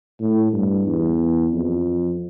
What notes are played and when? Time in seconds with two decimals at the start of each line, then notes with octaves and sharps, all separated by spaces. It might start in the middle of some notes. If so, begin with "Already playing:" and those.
0.20 A2
0.53 G2
0.86 E2
1.52 F2